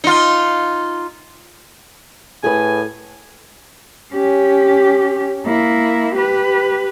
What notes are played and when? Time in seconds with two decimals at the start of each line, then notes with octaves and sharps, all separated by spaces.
0.04 D#4 F4
2.44 A2 G#4 B4 G#5
4.14 C#4 G4
5.46 A#3 E4
6.16 G4 B4